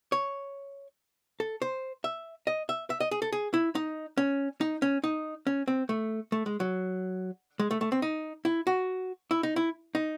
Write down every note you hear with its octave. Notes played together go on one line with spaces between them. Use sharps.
C#5
A4
C5
E5
D#5
E5
E5
D#5
G#4
A4
G#4
E4
D#4
C#4
D#4
C#4
D#4
C#4
C4
A3
A3
G#3
F#3
G#3
A3
A3
C4
D#4
E4
F#4
E4
D#4
E4
D#4